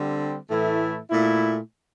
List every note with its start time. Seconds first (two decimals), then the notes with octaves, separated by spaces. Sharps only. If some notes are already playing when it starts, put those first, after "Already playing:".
Already playing: D3 G3 C4
0.50 A2 E3 A3 E4
1.10 A#2 A3 E4